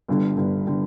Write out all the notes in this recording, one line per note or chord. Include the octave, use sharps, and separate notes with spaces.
G1 G2 D3 G3
G1 G2 D3 G3
D3 G3